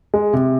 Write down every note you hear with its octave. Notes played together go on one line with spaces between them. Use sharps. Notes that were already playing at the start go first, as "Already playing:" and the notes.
G#3
C3